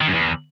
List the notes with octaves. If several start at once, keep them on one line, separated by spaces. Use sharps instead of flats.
D#3
F#2
E2